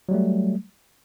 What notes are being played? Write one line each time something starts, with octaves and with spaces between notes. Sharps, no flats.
F#3 G3 A3